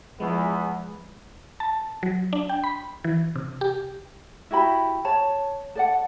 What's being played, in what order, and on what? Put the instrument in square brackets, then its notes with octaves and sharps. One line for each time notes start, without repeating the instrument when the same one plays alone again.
[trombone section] E2 B3 [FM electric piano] F3 G#3
[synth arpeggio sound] A5
F#3
D4
G5
B5
E3
C3
G4
[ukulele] E4 F#4 G4 B5
C#5 A5
A4 D5 F#5